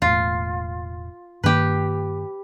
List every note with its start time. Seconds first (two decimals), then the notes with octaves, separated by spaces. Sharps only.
0.02 E1 A2 F4
1.44 G2 D#3 A#3 G4 B4